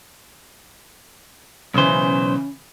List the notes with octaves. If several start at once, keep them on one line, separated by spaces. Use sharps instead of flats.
B1 C#3 E3 C#4 C5